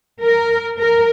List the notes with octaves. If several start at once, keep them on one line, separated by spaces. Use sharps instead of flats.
A#4
A#4